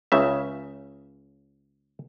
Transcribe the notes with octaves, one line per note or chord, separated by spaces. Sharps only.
C#2 C#3 E5